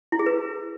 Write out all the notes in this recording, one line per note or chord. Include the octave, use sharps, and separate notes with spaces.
E4
G#4
B4